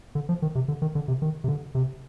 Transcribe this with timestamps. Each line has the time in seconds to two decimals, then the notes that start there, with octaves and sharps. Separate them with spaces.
0.15 D3
0.29 F3
0.42 D#3
0.55 C3
0.68 D3
0.82 D#3
0.95 D3
1.08 C3
1.22 D#3
1.44 C3
1.48 D3
1.75 C3